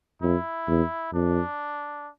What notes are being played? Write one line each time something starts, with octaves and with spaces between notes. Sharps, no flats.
F2 E4
E2
F2 D4